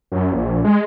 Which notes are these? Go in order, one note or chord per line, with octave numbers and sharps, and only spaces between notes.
F#2
A#1
G#3